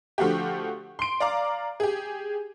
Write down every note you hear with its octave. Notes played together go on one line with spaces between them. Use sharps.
D3 F3 A3 F#4 G4
C6 D7
D5 F5 A#5 D6
G4 G#4